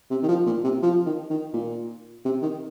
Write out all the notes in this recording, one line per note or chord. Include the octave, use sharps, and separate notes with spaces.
C3
D#3
F3
A#2
C3
F3
D#3
D#3
A#2
C3
D#3